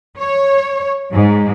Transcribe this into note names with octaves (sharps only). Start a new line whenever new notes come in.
C#5
G#2